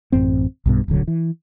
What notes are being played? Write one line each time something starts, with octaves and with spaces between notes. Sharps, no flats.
A1 F#2 C4
B1 G2 B2
D1 B1 D3 F#3
E3